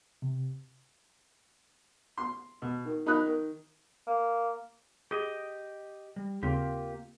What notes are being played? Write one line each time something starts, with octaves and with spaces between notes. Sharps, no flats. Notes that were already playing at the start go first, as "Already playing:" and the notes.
C3
C6
B2
D#3
D#3 D#4 B5 D#6 F#6
D#3
A#3
G4 G#4 D#5
G3
D#2 C#3 A#3 C4 F4 G4